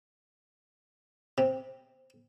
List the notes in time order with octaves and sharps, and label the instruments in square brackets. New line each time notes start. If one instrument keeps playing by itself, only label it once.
[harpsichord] C3